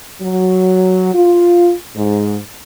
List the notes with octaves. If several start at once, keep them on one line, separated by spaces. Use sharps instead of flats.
F#3
F4
G#2